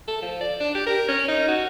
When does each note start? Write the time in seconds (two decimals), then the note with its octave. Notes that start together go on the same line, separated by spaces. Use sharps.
0.08 A4
0.22 F3
0.41 D5
0.60 D4
0.74 G4
0.87 A#4
1.08 C#4
1.28 D#4
1.48 F#4